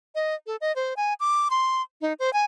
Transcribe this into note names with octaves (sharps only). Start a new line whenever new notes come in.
D#5
A4
D#5
C5
G#5
D6
C6
D#4
C5
G#5